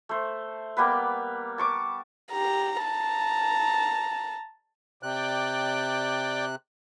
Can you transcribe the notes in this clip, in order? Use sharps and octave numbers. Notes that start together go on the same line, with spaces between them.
A3 C5
G3 A#3 B3 B4
A5 C#6 D6
G4 A#5
A5 A#5
C3 D5 G5 F#6